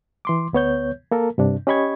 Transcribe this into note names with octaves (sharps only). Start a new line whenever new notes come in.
E3 C6 D6
D2 B3 C#5 G6
A#3 A4 A#4
G2 C3 D4
C#4 G4 D#5 B5 C#6 G#6